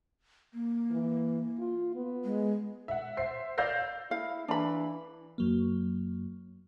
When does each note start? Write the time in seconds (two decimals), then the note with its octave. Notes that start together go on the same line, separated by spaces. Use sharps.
0.54 A#3
0.91 E3
1.59 F4
1.96 B3
2.24 G#3
2.88 E5 F#5
3.17 C5 E5 C7
3.58 D5 F5 E6 G6 A#6 C7
4.11 E4 F5
4.48 E3 D4 B5
5.38 F#2 F#3 A#3